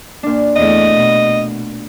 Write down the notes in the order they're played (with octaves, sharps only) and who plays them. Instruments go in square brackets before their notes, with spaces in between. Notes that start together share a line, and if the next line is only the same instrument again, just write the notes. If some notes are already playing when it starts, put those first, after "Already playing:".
[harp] A#2 D4
[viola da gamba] E2 A3 [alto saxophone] D#5
[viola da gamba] B2